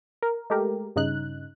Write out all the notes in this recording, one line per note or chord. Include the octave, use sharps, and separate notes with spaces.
A#4
G#3 A3 G4 A#4
G2 C#3 D#4 F#6